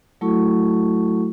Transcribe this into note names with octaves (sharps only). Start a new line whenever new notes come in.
F#3 A3 E4 F#4 A4 C#6